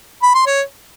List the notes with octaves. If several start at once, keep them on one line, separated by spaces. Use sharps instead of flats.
B5
C6
C#5